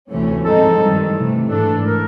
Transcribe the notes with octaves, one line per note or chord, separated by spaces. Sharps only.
D2 C3 E3 A3 C#4
G#2 F3 G#3 C4 D#4 A4
G2 D#3 G3
C3 E3 A3
G#2 E3 A3 D4 A4
A#4